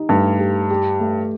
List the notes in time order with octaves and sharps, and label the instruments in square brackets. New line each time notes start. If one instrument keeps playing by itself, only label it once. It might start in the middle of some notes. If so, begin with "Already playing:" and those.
Already playing: [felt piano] D#4 G4
[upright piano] G2 [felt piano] A3
[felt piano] G4
G4
A3